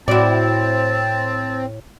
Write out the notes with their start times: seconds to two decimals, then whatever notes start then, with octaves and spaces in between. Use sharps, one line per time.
0.08 A2 C4 E4 F#4 D5 A5